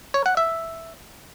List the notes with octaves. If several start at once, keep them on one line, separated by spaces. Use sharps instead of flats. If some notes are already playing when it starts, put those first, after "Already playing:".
C#5
F#5
E5